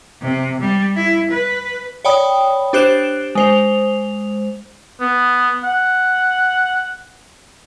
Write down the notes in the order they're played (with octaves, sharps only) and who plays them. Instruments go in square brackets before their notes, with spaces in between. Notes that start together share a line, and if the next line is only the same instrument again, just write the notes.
[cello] C3
G3
E4
B4
[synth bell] C#5 D5 G5 B5 D#6
D4 G4 C5 F#6 D7 E7
G#3 C5 F7
[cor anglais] B3
F#5